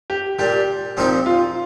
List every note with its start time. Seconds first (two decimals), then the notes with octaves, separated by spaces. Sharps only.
0.10 G4
0.39 A#2 G3 D4 G4
0.97 A#2 F3 C4 D#4 G4
1.26 F4